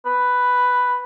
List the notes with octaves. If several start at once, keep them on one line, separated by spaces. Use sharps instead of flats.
B4